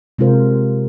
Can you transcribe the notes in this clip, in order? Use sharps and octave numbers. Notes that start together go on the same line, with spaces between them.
C3 G#3 C4 F4 A#4 C5